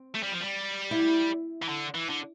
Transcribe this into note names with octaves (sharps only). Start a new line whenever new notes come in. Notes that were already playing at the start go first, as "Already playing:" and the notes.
Already playing: C4
A3
G3
F3
G3
E4
E3
D3
E3
D3